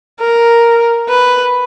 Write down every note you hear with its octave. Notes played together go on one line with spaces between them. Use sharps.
A#4
B4